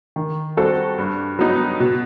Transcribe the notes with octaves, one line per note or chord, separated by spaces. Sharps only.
D#3
G3 C4 F#4 A4
G2
F#3 B3 D#4
B2